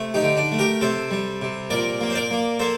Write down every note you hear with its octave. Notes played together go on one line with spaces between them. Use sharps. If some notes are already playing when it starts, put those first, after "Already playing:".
Already playing: C3 A3
D#4 G4
D3
D4
A3
G4 A#4
C3 A4 C5
G3
C3
A#2 A#4 D5
A#3
C5
A#4 D5
A#3
A#3 A4 C5